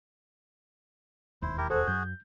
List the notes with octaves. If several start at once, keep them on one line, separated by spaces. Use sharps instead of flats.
E1 D#2 E4 C5
E4 G4 A#4
F#4 G#4 A4 C5
F#2 F#3 G6